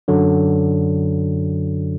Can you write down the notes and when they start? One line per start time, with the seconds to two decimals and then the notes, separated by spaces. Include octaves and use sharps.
0.08 F#2 D3 F#3